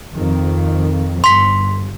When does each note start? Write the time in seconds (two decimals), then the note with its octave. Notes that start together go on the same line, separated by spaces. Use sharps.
0.15 F2 D#3
1.24 G1 C6 B6